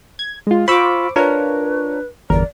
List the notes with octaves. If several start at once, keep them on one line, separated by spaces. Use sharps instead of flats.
G#6
G#3 F4
F4 C5 B5 C#6 D6 E6
D4 F4 A#4 B4 C#5
G1 E2 A#4 D5